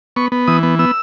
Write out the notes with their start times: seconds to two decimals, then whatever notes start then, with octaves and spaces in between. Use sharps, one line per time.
0.16 B3 C#6
0.32 B3
0.48 E3 D#6
0.63 B3
0.79 B3 E6